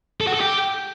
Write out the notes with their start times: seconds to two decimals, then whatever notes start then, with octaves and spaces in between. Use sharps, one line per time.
0.21 A4
0.27 F#4
0.34 A4
0.41 G4